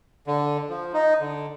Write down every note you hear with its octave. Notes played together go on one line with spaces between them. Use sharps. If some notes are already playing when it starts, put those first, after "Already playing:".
D3
F3
D#4
D3